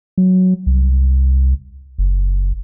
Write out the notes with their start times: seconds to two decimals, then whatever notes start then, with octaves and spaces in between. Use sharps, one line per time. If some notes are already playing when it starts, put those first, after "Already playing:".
0.18 F#3
0.66 C2
1.98 F#1